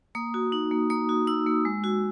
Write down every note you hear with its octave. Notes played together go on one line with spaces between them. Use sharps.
A#3 D#6
F#4
D#4
A#3
A#3 D#6
F#4
D#4 E6
A#3
G#3
F#4